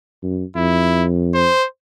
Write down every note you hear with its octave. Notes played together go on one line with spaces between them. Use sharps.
F#2
F2 E4
C5